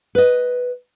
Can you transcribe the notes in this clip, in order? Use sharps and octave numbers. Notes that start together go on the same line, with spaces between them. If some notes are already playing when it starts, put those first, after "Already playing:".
B4 D#5